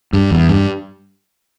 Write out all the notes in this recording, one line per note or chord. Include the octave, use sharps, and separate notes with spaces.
G2
E2
G2